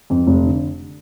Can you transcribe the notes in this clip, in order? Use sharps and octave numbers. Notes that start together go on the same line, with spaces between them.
F2
F1
D3